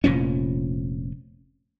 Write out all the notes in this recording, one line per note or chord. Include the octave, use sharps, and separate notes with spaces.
F1 A#2 F3 C#4